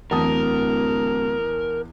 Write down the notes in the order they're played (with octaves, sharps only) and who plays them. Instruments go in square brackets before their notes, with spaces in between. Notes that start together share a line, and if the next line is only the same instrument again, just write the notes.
[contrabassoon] D1 [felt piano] E2 A5 D#6 [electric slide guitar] A#4